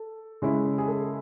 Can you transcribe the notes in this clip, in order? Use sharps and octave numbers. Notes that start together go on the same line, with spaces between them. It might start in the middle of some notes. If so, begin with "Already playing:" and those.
Already playing: A4
C#3 G#3 C#4 E4
G#4
A4